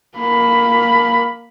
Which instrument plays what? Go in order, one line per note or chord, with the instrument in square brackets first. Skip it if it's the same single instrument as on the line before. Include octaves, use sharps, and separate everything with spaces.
[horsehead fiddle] A#3 B5